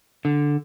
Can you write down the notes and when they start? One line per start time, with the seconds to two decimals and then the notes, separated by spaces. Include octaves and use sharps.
0.25 D3